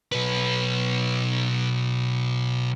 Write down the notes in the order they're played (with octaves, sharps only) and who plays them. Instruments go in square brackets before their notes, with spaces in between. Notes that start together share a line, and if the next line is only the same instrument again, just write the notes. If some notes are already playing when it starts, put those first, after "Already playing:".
[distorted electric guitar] B1 B4